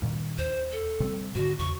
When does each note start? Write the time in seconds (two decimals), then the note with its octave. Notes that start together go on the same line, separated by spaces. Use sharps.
0.02 G2 A#2 D#3
0.38 D#2 C5
0.72 A4
1.00 C3 G3 C4
1.35 G#2 D3 F#4
1.59 E2 C#3 C#6